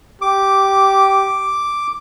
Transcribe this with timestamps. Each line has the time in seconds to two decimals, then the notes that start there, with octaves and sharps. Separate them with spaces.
0.22 G4 D6